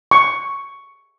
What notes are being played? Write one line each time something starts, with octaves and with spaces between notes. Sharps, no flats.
C#6